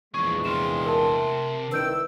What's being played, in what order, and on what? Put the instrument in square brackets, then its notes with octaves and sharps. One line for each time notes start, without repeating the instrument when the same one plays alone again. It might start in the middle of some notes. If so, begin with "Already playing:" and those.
[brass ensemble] A#1 E2 G#3 [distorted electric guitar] F3 G#4 [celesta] C#6
[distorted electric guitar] C3 F5 [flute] C6 [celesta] E7
[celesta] A#4 A5
[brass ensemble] C2 D#3 [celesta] B4 G6 D7 [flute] E6